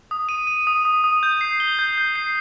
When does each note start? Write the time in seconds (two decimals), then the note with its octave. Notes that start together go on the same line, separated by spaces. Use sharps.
0.11 D#6
0.29 D#7
0.47 D#7
0.67 D#6
0.85 D#6
1.04 D#6
1.23 G6
1.41 C7
1.60 G7
1.79 G6
1.98 G6
2.15 C7